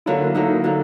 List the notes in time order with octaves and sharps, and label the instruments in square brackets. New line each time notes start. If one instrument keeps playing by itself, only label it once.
[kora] D3 F#3 A#3 [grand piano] E4
[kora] D3 F#3 A#3 [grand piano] D#4
[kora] D3 F#3 A#3